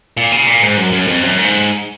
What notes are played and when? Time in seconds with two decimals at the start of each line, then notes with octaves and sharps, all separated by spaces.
0.17 A#2
0.32 C#3
0.47 A#2
0.62 G#2
0.77 F#2
0.92 F#2
1.07 F2
1.23 F#2
1.38 G#2